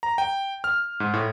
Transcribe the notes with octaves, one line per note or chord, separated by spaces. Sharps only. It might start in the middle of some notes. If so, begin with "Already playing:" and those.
A#5
G5
F6
G#2
A2